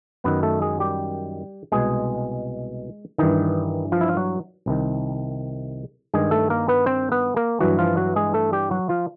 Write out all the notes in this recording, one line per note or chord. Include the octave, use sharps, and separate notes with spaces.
F#2 D#3 B3 B4
A3 A4
G#3 G#4
G3 G4
C2 B2 G#3 G#4
G2 D#3 E3 D#4
F3 F4
E4
F4
F#3 F#4
C2 C3 D#3
G2 D#3 G#3 G#4
A3 A4
A#3 A#4
B3 B4
C4 C5
B3 B4
A#3 A#4
G2 E3 F#3 F#4
F3 F4
F#3 F#4
G#3 G#4
A3 A4
G3 G4
F#3 F#4
F3 F4